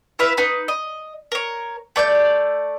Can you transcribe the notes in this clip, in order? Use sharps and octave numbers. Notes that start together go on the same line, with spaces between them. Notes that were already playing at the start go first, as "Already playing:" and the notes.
E4 B4 E5 F5
D#4 B4
D#5
A#4 C#5
A3 D5 G#5 G6